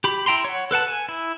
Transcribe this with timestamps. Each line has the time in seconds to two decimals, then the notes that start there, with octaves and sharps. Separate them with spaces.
0.04 G4 B5
0.26 E4 G5 A#5 C6
0.44 C#5 F#5
0.71 A4 B4 F#5 A5
0.87 G#5
1.09 E4